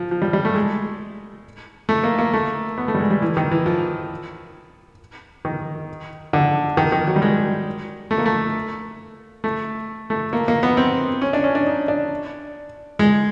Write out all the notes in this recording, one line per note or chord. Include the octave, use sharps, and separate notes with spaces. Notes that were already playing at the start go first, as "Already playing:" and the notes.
Already playing: F3
F3
G3
G3
A3
G#3
A3
A#3
A#3
A3
B3
A3
G3
G#3
G3
E3
D#3
E3
F3
D#3
D3
D#3
D#3
F#3
G3
G#3
A3
A#3
A3
A3
A3
A#3
A#3
B3
C4
C#4
D4
C#4
D4
D#4
D4
G#3